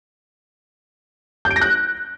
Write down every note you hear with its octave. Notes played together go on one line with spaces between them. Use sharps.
G6
D7
A#6
F#6